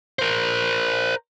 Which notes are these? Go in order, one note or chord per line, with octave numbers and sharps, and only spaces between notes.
A#4 C5